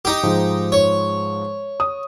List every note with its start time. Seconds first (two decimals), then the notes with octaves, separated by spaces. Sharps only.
0.05 D#4 G4
0.23 G#2 F3 G#3
0.72 C#5
1.80 D#6